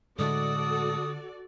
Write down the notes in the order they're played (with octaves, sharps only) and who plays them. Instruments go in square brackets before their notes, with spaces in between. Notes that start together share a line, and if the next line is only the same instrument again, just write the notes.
[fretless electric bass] A2 G#3 A3 [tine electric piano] D3 [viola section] F#4 A4 D5 [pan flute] D#6